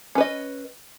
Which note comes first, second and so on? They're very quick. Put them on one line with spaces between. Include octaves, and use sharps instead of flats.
C#4 B4 D#5